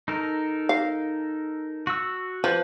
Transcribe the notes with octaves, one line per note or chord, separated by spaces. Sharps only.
D#4 A4 A#4
F5
F#4 E6
F3 B4